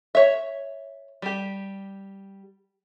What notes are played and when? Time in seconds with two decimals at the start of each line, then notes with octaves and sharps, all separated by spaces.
0.15 C#5 E5
1.22 G3 G4